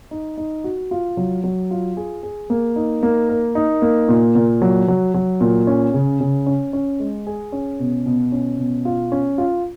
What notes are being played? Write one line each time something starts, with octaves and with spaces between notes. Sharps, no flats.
D#4
D#4
F#4
F4
F#3
F#3
F4
G#4
G#4
A#3
D#4
A#3
A#4
D#4
A#3
A#2
A#2
F#3
F#3
F#3
A#2
C#4
C#3
C#3
C#4
C#4
G#3
G#4
C#4
B2
B2
C#4
B2
F4
C#4
F4